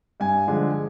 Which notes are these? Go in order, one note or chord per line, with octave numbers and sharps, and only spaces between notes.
G2 G#5
D3 F3 G#3